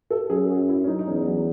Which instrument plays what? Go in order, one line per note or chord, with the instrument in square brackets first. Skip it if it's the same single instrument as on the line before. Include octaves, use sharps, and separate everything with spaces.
[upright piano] A4
[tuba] F#2 [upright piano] G#4
[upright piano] F#4
E4
C#4
D#4
D#4
[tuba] E2 [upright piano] C#4
[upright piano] F#3